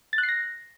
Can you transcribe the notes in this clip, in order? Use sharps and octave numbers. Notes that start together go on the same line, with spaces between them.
A6
F#6
C7
A#6